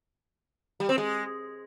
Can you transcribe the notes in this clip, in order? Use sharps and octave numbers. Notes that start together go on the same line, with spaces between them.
G3
C4
G#3